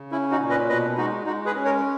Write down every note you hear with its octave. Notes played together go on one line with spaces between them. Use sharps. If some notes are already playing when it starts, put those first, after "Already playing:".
Already playing: C#3
C#4 E4
D#4 F#4
A#2
B4 D#5
B2 B4 D#5
G#3 D#4 F#4
G#3 D#4 F#4
G#4 B4
C#4
A#4 C#5